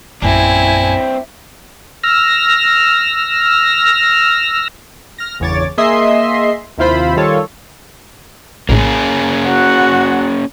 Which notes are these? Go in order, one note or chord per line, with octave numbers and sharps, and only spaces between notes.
A#1 F#2 C4 D4 E4 G#5
E6 F6 A#6
F6 A#6
G1 E2 C#3 C#5 D6 A6
A#3 G#4 D#5 E5 C6 C7
D#2 C3 E4 F4 C5 B5
D#3 G3 F4 A4 C#5
A#1 A2 A#3 C#4 G#4
F#4 F#5